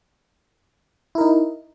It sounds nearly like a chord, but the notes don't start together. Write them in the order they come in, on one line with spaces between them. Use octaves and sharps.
E4 A#4 D#4